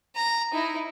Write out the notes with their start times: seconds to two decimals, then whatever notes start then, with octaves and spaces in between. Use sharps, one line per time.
0.16 A#5
0.52 D#4 E4